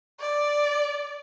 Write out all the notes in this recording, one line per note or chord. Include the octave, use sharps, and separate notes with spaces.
D5